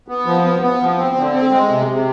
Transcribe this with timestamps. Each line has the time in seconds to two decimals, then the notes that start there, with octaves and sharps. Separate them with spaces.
0.08 B3
0.26 F3
0.44 B3
0.62 B3
0.80 F3
0.97 C4
1.16 D3
1.33 C4
1.51 G#3
1.70 C3
1.87 C3